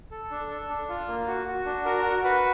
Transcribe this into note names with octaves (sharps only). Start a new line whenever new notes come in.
A4
D4
A4
D4
F4
A#3
F#4
F#4
D4
F#4 A#4
F#4
F#4 B4